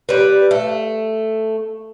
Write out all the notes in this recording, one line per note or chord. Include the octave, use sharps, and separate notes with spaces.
G3 B4
A3